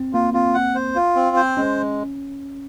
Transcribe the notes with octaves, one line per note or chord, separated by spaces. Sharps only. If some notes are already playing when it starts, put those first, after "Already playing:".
Already playing: C4
A#3 F4
C4 F4
F#5
C5
F4
C4
C5
G#3 C#4